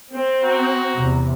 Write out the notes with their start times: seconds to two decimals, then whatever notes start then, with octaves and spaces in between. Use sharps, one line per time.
0.12 C4
0.43 F#4 A#5
0.96 E2 C3